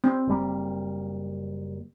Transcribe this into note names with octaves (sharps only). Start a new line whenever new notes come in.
C4
F#1 G3 A#3